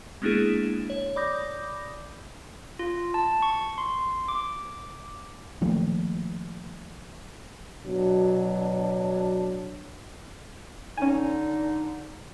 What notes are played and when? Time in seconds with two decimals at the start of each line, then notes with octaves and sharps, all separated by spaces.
0.22 G#3 A#3 B3 D4 E4 G#4
0.90 C#5
1.16 D5 B5 D6 D#6 G6 A#6
2.79 F4
3.14 A5
3.42 C#6
3.78 C6
4.28 D6
5.61 D#3 F3 A3 A#3
7.85 B2 F#3 D4
10.97 D3 C#4 D#4 G#5